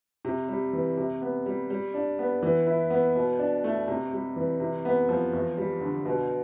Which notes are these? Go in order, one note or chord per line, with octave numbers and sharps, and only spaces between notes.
C3
G3
E3
C3
B3
G3
G3
D4
B3
E3
E4
B3
B2
D4
A3
C3
G3
E3
C3
B3
F3
E2
G3
D3
B2